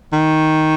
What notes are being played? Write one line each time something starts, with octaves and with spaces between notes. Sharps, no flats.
D#3